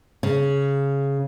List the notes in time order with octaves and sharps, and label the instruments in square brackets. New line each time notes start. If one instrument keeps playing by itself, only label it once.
[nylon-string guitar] C#3